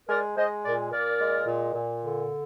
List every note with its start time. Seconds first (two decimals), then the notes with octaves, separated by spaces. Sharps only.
0.09 G#3 A#4 D5
0.36 G#3 C5 D#5
0.64 A#2 A#4 D5
0.91 A#2 A#4 D5
1.19 G#3
1.46 A#2
1.73 A#2
2.02 D3